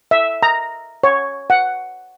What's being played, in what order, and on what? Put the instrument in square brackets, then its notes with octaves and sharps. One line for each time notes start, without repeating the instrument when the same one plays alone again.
[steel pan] E5
A#5
C#5
F#5